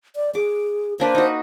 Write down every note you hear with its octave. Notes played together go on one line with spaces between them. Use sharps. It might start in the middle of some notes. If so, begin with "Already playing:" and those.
D5
G#4 D6
A#3 D4 B4 C5
D#4 F#4